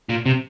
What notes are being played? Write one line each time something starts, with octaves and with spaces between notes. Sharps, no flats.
A#2
C3